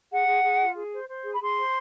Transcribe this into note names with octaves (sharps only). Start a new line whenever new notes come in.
G#4 F#5
G#4
G#4
F4
G#4
C5
C5
G#4
B5
G#4 C6
C5